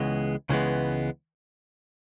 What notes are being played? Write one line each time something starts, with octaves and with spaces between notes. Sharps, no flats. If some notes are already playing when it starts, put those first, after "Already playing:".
Already playing: C#2 C#3 E3 G#3 B3
C#2 C#3 E3 G#3 B3